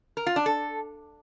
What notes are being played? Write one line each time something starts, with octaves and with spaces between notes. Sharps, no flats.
A#4
F4
D4
A4